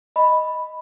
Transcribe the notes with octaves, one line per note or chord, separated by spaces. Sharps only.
D#5 B5